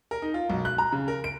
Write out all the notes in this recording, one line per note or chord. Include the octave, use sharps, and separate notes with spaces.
A#4
D#4
F4
B1
F#6
A#5
C#3
A#4
D7